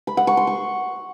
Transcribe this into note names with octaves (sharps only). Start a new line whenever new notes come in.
B5
F#5
C#6
C6
C#6